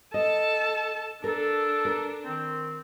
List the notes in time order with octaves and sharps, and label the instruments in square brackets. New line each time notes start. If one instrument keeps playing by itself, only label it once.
[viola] A4 A5 [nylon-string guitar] D#5
[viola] D4 [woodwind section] A4 [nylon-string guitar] A#4
[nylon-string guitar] A#4
[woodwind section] D#3 C4